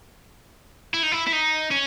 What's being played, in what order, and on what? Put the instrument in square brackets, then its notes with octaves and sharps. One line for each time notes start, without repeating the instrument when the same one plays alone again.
[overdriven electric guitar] E4
D#4
E4
E4
D#4
C#4